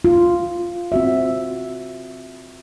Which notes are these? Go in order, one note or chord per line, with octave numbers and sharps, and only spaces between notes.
F4
C4 F#4 E5